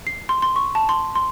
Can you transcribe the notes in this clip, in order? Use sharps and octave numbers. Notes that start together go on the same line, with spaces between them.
C7
C6
C6
C#6
A5
C6
C6